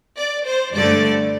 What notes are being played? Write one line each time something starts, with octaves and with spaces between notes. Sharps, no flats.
D5
C5
G2 D3 A3 D5